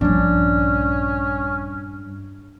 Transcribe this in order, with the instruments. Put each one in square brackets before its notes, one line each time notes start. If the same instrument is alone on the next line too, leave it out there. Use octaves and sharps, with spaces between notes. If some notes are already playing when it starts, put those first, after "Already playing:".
[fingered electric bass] A#1 F3 [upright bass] G2 G3 [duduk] C#4 [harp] D4